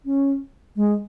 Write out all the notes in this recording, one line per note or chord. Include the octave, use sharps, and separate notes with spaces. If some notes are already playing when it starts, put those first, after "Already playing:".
C#4
G#3